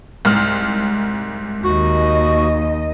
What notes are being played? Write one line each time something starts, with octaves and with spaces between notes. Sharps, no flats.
C2 G#2 F6
D#2 F#4 D#5